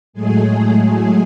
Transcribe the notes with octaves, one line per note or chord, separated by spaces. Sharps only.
A2 F#3 G#3 A3 G#4
A2 F#3 A3
A2 F#3 G#3 A3 G#4